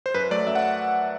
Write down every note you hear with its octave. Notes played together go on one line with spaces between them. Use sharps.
C5
F#2 B4
F#3 A3 D5
F#2 E5
F#5